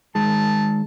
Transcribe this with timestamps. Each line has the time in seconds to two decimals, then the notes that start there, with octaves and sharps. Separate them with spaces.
0.15 D#3 G#3 A5